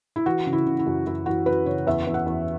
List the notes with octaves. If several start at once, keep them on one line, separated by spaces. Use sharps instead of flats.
E4
E3 F#4
C#3
E4
C#3
E4
F#2
F#2 E4
E3 F#4
F#2 B4
C#3 C#5
E2 E5
E2
F#5
E2